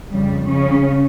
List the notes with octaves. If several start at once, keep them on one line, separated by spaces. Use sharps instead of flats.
F2 C#3 G3
C#3 C#4